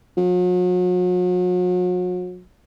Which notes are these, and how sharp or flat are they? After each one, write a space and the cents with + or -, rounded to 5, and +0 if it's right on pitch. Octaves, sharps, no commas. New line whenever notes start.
F#3 -40